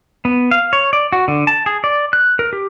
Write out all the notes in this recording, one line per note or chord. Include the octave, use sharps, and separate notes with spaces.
B3
F5
C#5
D5
F#4
D3
A5
G#4
D5
F#6
A#4
G4